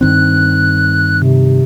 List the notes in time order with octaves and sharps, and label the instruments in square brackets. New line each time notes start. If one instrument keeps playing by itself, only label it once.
[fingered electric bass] G2 D#3 C4 [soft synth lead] F#6
[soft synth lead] C3